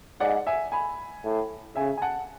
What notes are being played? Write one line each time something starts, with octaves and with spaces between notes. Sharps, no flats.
G#2 D5 F#5
E5 G#5
G#5 B5
A2
C#3 E5 G#5
G#5
F#5 A5